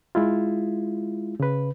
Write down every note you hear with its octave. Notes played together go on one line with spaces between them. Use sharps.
G#3 E4 F4
C#3 B4